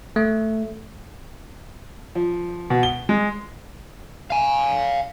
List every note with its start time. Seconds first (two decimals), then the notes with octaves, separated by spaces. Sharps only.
0.16 A3
2.15 F3
2.70 B2
2.83 G7
3.09 G#3
4.30 F5 G#5